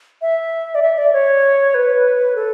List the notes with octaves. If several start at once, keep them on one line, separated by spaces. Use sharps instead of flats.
E5
D5
E5
D5
C#5
B4
A4